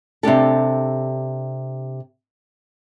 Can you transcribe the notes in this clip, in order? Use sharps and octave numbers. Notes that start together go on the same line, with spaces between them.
C3 D4 G4 A4